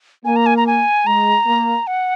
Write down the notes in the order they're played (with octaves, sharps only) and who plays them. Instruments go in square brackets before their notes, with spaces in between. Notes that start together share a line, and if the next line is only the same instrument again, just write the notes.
[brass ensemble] A#3 [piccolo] G#5
[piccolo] A#5
G#5
A#5
G#5
[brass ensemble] G#3 [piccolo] A#5
[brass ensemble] A#3
[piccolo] F#5